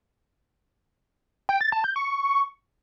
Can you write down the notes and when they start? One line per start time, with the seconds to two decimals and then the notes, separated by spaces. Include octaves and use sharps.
1.49 G5
1.61 A6
1.72 A5
1.84 G6
1.96 C#6